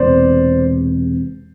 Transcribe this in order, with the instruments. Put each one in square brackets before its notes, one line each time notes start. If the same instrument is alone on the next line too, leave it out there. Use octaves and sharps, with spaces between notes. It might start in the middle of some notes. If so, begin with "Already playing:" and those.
Already playing: [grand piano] E1 E2 C3 C5 D5